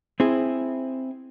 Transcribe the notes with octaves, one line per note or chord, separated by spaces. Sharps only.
C4 E4 G#4